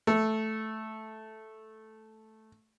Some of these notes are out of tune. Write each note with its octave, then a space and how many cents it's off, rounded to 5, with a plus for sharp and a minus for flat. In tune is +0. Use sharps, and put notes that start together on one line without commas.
A3 -5